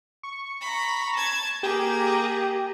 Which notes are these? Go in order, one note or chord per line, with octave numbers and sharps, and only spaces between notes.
C#6
A#5 B5
A5 G#6
A#3 G4 G#4